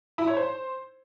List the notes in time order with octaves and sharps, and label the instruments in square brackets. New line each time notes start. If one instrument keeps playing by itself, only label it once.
[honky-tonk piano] E4
C#5
C5